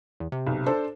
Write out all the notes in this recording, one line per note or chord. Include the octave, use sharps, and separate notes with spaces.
E2
C3
B1
D4 A4 C5